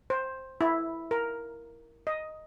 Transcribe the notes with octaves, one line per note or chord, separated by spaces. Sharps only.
C5
E4
A#4
D#5